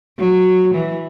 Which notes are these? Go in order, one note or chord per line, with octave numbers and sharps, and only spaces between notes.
F#3
E3